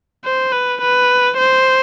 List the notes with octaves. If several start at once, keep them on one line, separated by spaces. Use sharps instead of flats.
C5
B4
B4
C5